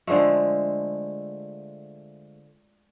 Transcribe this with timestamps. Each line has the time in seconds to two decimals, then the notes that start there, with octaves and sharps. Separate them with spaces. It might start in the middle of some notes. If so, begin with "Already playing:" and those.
0.07 D3 F3 G#3 A3